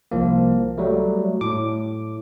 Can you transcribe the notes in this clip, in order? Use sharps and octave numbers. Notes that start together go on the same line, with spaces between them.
C2 F3 A#3
F#3 G3 A3
A2 D6